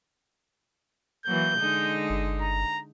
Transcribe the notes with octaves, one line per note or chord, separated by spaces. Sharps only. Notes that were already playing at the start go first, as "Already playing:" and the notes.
E3 F#3 A#3 G6
D3 G#3 D#4
G1
A#5